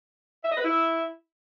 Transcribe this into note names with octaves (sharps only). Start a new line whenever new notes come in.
E5
D#5
B4
E4